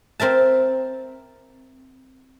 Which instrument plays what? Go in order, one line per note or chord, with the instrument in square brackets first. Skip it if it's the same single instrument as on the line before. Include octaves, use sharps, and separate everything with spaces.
[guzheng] C4 A#4 E5 A5